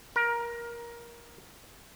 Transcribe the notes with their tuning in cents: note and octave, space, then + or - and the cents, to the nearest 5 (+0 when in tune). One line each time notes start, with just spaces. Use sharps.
A#4 +20